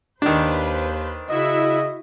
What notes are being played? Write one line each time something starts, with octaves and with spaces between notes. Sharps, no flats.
D#2 D#3 D4 B4 C5
C#3 E4 F#4 D#5 E5